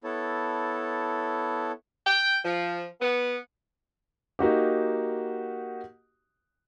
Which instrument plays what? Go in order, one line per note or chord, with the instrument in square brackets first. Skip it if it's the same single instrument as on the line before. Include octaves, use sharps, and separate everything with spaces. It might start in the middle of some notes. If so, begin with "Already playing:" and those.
[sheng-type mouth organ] B3 E4 A4 C#5 A5
[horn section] G5
F3
B3
[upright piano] A#3 D#4 F#4 G4